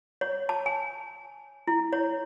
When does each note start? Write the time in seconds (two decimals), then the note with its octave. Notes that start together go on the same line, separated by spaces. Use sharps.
0.21 C#5
0.49 A5
0.66 G#5
1.67 E4
1.93 C#5